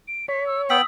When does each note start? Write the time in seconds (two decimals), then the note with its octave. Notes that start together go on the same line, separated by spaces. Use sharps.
0.08 D7
0.28 C#5 B6
0.46 E6
0.70 B3 G5 D#6 E6 B6 F#7